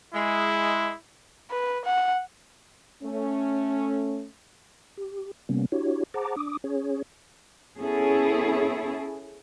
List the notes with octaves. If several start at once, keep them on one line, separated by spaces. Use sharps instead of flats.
G#3 E4
B4
F#5
A3 C#4
G4
C3 G3 A#3 B3 C#4
D4 E4 F#4 G4 C#5
G#4 C5 F#5 A5 A#5 D6
D4 D6 D#6
C#4 G#4 C#5
B3 C#4 E4 G#4 A4